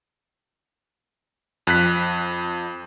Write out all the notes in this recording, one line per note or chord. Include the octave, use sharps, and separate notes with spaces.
F2 F#6 B6